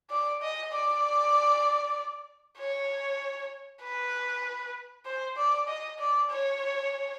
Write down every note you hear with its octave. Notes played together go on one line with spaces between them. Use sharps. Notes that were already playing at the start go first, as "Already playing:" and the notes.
D5
D#5
D5
C#5
B4
C5
D5
D#5
D5
C#5